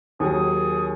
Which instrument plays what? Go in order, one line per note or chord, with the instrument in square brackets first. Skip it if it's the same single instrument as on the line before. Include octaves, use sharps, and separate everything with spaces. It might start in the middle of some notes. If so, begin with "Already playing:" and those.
[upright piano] D#2 D#3 F#3 [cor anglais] G#4